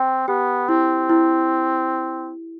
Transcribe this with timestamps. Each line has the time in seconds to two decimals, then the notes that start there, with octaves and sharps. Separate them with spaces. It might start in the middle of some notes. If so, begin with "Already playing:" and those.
Already playing: C4 G5
0.28 B3 G4
0.69 C4 E4
1.09 E4